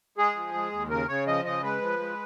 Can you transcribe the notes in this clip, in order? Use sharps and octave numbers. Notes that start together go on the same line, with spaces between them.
G#3 G#4
F3
G#3
D#2
C#3 A#4
C#3 C#5
F3 D#5
C#3 D#5
G#3 B4
F3
G#3